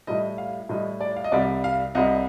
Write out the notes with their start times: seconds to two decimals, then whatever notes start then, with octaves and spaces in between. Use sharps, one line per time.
0.07 A2 G3 D#5
0.38 F5
0.69 A2 G3 D#5
1.01 D5
1.16 F5
1.24 D#5
1.32 C2 C3 G3 D5
1.64 F5
1.95 C2 C3 G3 D#5